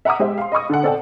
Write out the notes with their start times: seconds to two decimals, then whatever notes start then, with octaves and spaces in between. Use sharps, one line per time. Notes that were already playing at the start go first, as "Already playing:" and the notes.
0.05 E5 F#5 A#5 D6 D#6
0.19 G#3 G4 C5 E5
0.38 F5 C6
0.52 D#5 B5 C#6 D#6
0.70 D3 A4 F#5
0.83 C4 A4 D5 F#5 G5 A5